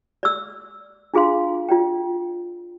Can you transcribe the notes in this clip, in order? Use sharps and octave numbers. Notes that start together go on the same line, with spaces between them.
D5 E6
D4 F4 G#4 F5 C6
F4 D5 G5